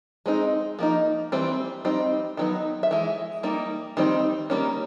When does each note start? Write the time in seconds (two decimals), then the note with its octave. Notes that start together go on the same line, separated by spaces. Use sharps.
0.26 G#3 C4 D#4
0.79 F3 A#3 D#4
1.32 E3 G3 C4
1.85 G3 C4 D#4
2.37 D#3 F#3 B3 D#4
2.83 E5
2.91 E3 G#3
3.43 G3 A#3 D#4
3.97 D#3 G3 C4 D#4
4.50 D#3 G3 A#3 C#4